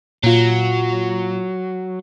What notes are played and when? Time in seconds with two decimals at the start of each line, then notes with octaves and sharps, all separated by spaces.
0.24 A#2 F#3 F4